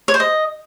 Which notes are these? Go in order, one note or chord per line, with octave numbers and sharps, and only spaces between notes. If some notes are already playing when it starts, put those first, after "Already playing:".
C#5
C5
D#5